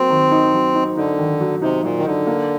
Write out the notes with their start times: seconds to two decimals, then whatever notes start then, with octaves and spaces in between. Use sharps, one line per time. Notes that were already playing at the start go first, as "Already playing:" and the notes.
Already playing: F#3 A#3 C4
0.10 D#3
0.32 D#4
0.54 F#3
0.75 D#4
0.97 D3 D#4
1.18 D#3
1.40 F#3
1.62 C3 D#4
1.84 A#2 F#3
1.98 D#3
2.05 D3 D#4
2.27 A#3